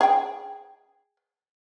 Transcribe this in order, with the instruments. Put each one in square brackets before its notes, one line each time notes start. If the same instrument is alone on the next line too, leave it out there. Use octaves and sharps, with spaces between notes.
[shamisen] G#4 G5